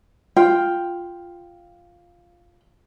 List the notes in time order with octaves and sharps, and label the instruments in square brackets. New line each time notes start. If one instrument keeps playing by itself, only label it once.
[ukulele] F4 G5